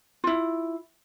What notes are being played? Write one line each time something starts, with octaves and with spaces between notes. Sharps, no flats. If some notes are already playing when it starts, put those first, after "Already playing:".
E4 F4